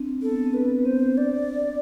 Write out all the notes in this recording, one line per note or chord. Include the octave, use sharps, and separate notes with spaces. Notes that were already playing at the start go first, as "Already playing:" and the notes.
Already playing: C4 D4
B3 A4
C4
D4 B4
B3
C4 C5
D4 D5